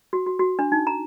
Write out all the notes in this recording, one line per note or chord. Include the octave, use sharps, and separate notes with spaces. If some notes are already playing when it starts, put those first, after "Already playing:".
F#4
F#4
F#4
D4
D#4
A#5